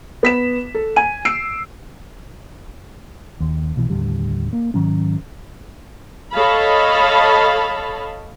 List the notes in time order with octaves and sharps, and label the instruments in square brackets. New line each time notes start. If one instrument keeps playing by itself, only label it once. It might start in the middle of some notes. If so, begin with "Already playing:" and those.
[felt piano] B3 B6 E7
A4
G#5 D#7
E6 C7 D7
[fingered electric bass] D#2
B1 B2 E3
D#2 A2 D3 G3
A#3
G#2 D#3 F#3 C#4
[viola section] A4 C#5 D#5 F5 A5 B5